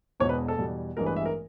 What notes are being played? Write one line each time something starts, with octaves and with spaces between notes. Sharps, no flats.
E1 E2 B2 G#3 B3 C#5
B4
A4
E2 B2 G3
A1 G2 E3 G#3 B3 A#4
B4
E5
A#4